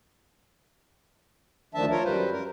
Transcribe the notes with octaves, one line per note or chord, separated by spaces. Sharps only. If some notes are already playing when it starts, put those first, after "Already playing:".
D2 D#3 F3 D4 E5 A5
F4 A#4 C#5
F#2 G3 B4 C5
A#4